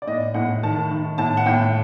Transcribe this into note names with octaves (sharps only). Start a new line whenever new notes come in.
D5
A2 D#5
A2 F#5
D#3 A5
D#3
A2 A5
F#5
A2 G5